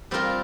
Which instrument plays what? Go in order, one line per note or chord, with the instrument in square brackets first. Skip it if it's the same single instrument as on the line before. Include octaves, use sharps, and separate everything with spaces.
[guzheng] G3 C4 F4 A#4